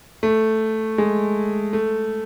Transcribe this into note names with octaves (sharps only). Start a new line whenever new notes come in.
A3
G#3
A3